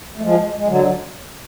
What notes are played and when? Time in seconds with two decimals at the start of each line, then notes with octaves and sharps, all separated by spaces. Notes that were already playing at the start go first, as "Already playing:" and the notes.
0.17 A3
0.22 F3 G#3
0.57 G#3
0.68 D3 F#3